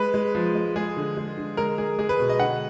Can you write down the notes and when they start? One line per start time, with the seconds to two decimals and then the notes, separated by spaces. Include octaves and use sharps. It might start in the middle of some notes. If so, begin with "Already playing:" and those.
Already playing: G#3 B4
0.14 G#3
0.35 F3
0.55 G#3
0.76 G#3 G#4
0.97 D3
1.17 G#3
1.38 D3
1.57 G#3 A#4
1.78 G#3 G#4
1.99 G#3 G#4
2.09 B4
2.19 B2
2.29 D#5
2.39 D3 F#5